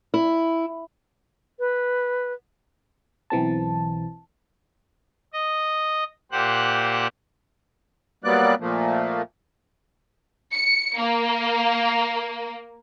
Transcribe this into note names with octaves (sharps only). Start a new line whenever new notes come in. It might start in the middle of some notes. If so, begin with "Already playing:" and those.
E4
B4
B1 E3 C4 A5
D#5
A#2 G4 C5 F#5 F#6
F#3 G3 A#3 B3 D5 F#6
A#2 F3 A3 A#3
C#7
A#3